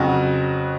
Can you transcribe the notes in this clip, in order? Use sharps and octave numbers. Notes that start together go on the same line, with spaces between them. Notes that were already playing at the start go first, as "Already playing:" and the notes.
Already playing: F2 C#3 F#3 F#4